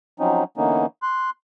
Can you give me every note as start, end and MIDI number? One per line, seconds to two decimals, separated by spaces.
0.20 0.44 53
0.20 0.44 54
0.20 0.44 60
0.20 0.44 61
0.20 0.44 63
0.57 0.86 50
0.57 0.86 52
0.57 0.86 58
0.57 0.86 59
0.57 0.86 61
0.57 0.86 63
1.02 1.30 84
1.02 1.30 90